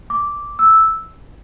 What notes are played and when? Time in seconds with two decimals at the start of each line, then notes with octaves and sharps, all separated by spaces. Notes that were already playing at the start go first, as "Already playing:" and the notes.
0.10 D6
0.59 E6